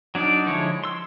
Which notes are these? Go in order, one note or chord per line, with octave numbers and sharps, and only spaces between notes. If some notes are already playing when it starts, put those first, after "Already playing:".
F#3 D4 D#4 D5
D3 F3 G#3 E4 C#5
C6 E6